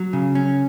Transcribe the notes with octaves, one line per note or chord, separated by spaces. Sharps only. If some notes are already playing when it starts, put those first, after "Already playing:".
Already playing: F#3
C#3
C#4